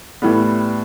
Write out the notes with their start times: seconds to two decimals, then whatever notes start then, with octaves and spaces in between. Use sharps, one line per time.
0.22 A2 E3 G3 B3